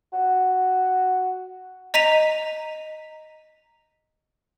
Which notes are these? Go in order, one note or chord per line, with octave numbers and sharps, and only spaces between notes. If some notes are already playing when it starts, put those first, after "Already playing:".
F#4
D#5 A#5 B6 D#7 F7